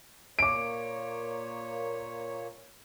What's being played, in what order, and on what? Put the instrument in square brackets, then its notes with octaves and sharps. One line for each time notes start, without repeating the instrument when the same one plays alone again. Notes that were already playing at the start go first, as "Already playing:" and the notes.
[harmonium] A#2 A#3 C#5 [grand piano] D6 D7